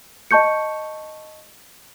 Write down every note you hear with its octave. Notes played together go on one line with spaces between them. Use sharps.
D#5 A5 C#6 G6 C#7